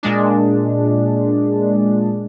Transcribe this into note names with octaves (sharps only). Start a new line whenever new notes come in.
A#2 G#3 D4